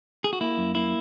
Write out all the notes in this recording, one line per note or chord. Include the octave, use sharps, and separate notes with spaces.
G#4
F#4
A#3 E4
F#2
A#3 E4